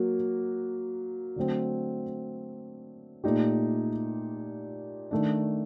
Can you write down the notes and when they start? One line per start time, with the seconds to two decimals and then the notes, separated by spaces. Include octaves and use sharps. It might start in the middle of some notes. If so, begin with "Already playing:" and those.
Already playing: F#3 A#3 F#4
1.36 D3 F#3 A3 C4
3.24 A#2 A3 D#4 G4
5.11 D#3 A3 D4